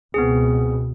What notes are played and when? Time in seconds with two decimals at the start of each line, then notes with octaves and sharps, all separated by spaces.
0.14 C#2 B2 B3 C4 G#4